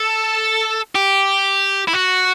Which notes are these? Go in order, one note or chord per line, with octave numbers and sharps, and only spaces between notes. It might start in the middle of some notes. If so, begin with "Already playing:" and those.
Already playing: A4
G4
E4
F#4